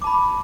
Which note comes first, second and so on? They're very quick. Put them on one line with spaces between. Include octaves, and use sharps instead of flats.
D6 A5 B5